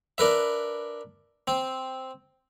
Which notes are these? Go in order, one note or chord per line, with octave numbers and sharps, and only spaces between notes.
D4 A#4 B4 E5
C4